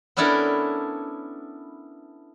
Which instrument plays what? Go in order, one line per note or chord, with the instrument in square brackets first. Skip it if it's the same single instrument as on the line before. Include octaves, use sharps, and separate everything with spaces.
[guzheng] B3 C#4 D4 E4 A4 A#4